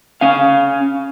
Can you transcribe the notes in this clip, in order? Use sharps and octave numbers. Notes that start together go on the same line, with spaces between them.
C#4 F5